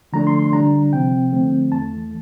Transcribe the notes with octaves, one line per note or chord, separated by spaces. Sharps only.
D3 F3 A3 D4 A#5
C6
C6
D3 G3 D4 A#5
C3 F3 C4 G5
D3 F3 A3 C4
E2 E3 A3 A5